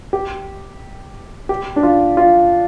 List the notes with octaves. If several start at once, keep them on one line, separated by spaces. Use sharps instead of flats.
G4
G4
D4
F4
F4